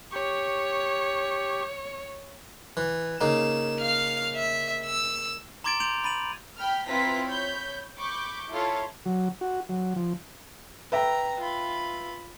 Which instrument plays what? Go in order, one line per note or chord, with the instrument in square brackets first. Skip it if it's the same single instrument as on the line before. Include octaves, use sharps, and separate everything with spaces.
[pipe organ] G4 C#6 [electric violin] C#5
[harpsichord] E3
[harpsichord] C#3 A#3 D#4 [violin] E7
[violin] F5 F6
E5
E6
[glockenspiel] A#5 C6 D6 G#6 A6 D7
C6 G6 D7 F7
B5 A6 D#7 F#7
[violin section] G5 B5 F6
C4 E4 F4 B4 A#5 B6
C#5 B5 G6
B5 C#6 D6 G6
E4 F4 A4 C#5 F5 C6
[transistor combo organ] F#3
F#4
F#3
F3
[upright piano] B4 E5 G5 [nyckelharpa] A#5
[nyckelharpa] F4 B5